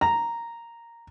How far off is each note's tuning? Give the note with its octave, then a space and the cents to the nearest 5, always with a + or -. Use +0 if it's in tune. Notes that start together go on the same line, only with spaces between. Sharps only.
A#5 -5